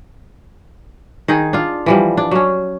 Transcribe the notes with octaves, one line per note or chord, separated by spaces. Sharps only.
D#3 D#4 G#4
D4 F4
E3 F3 G3
D4
F#3 C#4